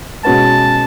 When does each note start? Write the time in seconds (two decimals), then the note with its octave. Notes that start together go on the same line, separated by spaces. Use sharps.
0.24 B2 G#3 C#4 F#4 B4 A5